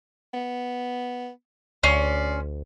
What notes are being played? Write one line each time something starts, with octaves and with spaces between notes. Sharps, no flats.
B3
D2 C#4 D5 C6